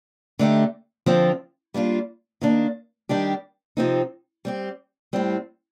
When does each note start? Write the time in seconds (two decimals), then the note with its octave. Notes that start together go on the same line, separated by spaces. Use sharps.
0.39 D3 A3 D#4 G4
1.06 D3 F3 C4 F4
1.74 G3 A#3 D4 F4
2.41 D#3 A#3 D4
3.09 D#3 G3 D4 G4
3.77 C3 F3 C4 D#4
4.45 G3 C4 G4
5.13 A2 G3 C4